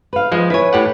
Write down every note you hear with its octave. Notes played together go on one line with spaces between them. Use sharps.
B4 F5
F3 G#3 B4
E4 B4 C#5 G#5
A2 G4 F#5